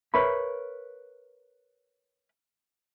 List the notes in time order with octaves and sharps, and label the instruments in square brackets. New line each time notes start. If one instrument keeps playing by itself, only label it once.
[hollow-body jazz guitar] A#4 B4 C#5 E5 B5